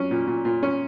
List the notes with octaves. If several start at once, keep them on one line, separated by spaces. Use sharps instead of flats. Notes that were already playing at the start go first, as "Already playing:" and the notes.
Already playing: F#3 C#4
A#2
A#2
A#2
C#4